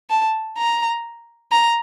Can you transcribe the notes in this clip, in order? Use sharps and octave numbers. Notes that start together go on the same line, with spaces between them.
A5
A#5
A#5